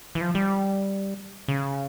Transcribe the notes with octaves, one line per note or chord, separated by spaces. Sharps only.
E3
F3
G3
C#3